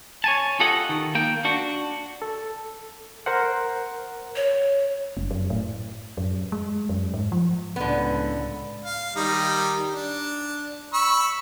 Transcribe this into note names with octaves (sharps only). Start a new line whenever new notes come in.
C#5 G#5 A5
F4 G4 A4 D#5 F#5
D#3
A#3 G5
D4 F#4
A4
A#4 C5 F#5
C#5
F#1
F#2
A2
F#2
G#3
F#2
G#2
F3
C#2 A2 D3 B3
F5
D#3 G3 D#4
D4
B5 C#6 E6